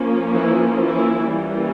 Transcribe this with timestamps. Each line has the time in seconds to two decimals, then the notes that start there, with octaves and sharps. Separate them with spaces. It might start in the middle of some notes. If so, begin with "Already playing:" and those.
Already playing: F3 A#3 C#4
0.34 E3 E4
0.80 E3 E4
1.27 E3 G3 A#3 C#4